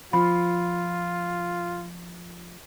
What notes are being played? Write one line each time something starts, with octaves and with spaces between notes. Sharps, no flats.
F3 F4 B5